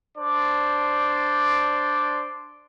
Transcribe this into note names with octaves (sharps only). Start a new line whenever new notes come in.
D4 C5 D5